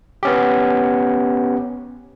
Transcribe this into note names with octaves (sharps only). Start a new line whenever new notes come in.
B3 C#4 G4